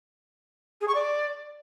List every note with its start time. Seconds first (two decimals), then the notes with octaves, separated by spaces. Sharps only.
0.80 G#4
0.87 C#6
0.94 D5